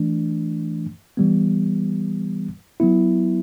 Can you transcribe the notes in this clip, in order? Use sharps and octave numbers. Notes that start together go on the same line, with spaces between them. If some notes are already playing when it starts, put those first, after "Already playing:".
Already playing: E3 A3 D4
E3 G3 B3
F#3 B3 E4